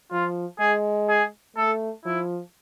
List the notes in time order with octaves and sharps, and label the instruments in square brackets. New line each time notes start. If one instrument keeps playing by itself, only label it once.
[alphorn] F3 [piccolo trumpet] F4
[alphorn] G#3 [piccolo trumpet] G#4
[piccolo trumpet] G#4
[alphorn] A3 [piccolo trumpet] A4
[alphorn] F3 [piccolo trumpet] E4